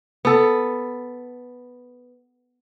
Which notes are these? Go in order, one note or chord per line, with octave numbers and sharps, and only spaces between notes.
B3 A4